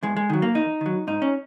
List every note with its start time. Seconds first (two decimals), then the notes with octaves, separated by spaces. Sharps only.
0.03 E2 G#3
0.17 G#3
0.30 D#3 F#3
0.42 A#3
0.55 E2 D#4
0.81 D#3 F#3
1.07 G#2 D#4
1.22 C#4